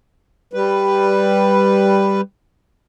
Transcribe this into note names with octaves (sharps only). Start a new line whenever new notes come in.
G3 B4